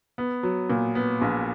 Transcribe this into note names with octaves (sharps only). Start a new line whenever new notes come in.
B3
F#3
A#2
B3
A#1